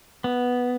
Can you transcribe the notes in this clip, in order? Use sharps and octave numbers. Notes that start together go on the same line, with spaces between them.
B3